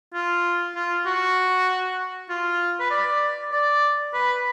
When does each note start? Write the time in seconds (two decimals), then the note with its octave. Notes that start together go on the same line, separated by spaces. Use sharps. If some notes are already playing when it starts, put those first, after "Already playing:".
0.14 F4
0.75 F4
1.06 F#4
2.29 F4
2.80 B4
2.91 D5
3.52 D5
4.14 B4